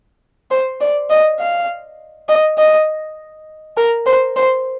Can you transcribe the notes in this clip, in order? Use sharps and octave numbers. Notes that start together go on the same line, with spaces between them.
C5
D5
D#5
F5
D#5
D#5
A#4
C5
C5